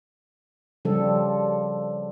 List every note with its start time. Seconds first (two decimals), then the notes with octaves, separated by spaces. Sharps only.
0.85 C#3 F3 G3 A4